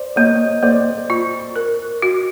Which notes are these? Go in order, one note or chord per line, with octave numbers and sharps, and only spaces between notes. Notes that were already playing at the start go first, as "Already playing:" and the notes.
Already playing: C5 D5
A#3 C#5 D#5
A#3 C5 D5
F4
A#4
F#4